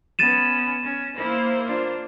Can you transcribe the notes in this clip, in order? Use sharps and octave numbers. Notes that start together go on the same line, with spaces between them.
B3 C#4 A6 D#7 E7
C#4
A#3 E4 C5
D4 F4